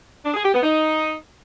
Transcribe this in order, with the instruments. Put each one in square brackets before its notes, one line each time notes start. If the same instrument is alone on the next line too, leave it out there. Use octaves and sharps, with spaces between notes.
[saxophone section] D4
G#4
G4
B3
D#4